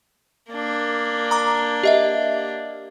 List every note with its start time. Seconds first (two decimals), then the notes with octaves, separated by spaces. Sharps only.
0.51 A#3 D4
1.31 A#5 D6
1.83 G4 D#5 E5